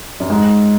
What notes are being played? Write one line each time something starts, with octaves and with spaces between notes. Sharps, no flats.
F#2
G#2